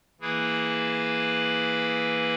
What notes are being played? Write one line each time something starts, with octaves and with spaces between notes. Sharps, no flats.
E3 A#3 E4 G#4 B4